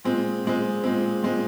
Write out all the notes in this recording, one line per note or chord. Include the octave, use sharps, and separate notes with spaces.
A#2 G#3 C4
A#2 G#3 C4
A#2 G#3 C4
A#2 G#3 C4